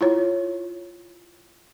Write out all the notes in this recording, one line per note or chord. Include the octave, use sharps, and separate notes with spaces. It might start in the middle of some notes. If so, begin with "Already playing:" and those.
E4 F4 C#5